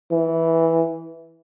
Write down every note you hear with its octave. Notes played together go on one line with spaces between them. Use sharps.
E3